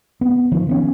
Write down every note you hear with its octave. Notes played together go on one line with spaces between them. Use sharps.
B3
D#3 F3
D#3 B3 C#4